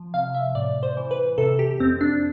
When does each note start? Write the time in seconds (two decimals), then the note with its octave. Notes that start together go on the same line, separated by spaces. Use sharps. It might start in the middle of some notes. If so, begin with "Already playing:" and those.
Already playing: F3
0.14 C3 F5
0.34 E5
0.55 A2 D5
0.83 C5
0.97 E3
1.11 B4
1.38 C3 A4
1.59 G4
1.80 F2 C4
2.01 D4